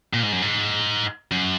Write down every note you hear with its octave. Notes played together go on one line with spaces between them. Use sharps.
A#2
G#2
F#2
G#2
F#2